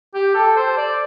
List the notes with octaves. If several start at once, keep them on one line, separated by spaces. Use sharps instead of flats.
G4
A4
C5
D5